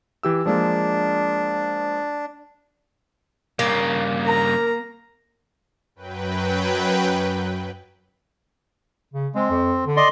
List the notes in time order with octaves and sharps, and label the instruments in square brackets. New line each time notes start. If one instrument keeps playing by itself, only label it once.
[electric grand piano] E3 G4 E6
[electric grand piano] F3 G#3 A#3 [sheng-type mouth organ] D4
[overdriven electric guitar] G2 C#3 [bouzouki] A#3
[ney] A#4 [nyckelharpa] A#5
[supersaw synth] F#2 F#3 B4 G5
[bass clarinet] C#3
[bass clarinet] G#3 [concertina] C4
[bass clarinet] F2
D3
[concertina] D5 D#5 C6